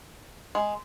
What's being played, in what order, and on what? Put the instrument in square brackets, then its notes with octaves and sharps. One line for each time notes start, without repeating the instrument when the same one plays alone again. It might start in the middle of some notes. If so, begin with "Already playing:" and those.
[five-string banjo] G#3